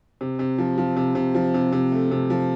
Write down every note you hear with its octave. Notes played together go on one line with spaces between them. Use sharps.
C3
C3
F3
F3
C3
C3
F3
C3
C3
A3
C3
F3